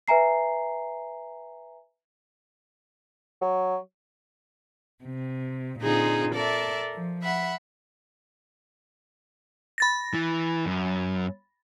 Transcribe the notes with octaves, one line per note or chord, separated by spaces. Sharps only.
B4 E5 G#5 A#5 C7
F#3
C3
A#2 D3 C4 D#4 F4 G#4
A4 A#4 D5 E5 A5
F3
E5 F#5 B5
B5 A6 A#6
E3
F#2